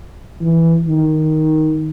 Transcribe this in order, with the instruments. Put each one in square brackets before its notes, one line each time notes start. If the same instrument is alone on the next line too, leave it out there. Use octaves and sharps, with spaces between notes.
[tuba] E3
D#3